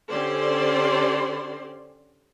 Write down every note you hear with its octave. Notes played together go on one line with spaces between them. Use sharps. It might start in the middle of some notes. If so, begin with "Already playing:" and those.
D3 C#4 G4 C5 D5 C6